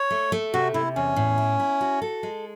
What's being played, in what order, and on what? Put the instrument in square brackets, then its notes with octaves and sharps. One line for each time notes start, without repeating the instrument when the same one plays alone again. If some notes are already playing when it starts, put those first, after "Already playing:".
Already playing: [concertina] C#5
[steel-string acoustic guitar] A3
A3
[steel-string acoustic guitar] C3 [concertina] F#4
[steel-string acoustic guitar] C3 [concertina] E4
[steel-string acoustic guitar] E2 [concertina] C#4
[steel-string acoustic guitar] A2
E4
E4
F#4
A4
G#3